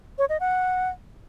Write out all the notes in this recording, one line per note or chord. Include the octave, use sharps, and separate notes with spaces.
C#5
D#5
F#5